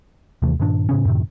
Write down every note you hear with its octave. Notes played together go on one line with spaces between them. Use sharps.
D#2 C3 E3 A3
G2 A#2 D#3 D4
A2 C#3 C#4
F#2 A2 C3 D#3